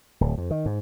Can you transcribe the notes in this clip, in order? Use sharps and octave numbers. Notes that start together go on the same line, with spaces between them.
D1
F2
D#3
G#2